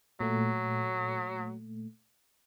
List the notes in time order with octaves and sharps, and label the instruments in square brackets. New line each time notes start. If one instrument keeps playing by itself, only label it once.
[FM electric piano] A#2 A3 [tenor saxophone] F#3